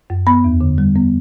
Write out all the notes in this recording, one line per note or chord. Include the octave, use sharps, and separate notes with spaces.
F#2
B3 B5
E2
D3
G3
B3